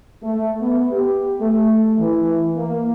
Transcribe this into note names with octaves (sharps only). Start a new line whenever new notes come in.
A3
B3
G4
A3
E3
A#3